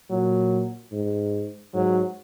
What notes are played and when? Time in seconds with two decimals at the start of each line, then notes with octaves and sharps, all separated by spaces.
0.10 A#2 F#3
0.92 G#2
1.74 G#2 F#3